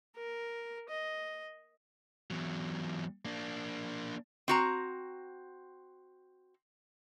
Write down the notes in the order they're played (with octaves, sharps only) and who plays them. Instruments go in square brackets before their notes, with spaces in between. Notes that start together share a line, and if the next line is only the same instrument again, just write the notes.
[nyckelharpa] A#4
D#5
[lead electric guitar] E2 F#3
A#3 D4
[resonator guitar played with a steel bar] C4 F#4 A#5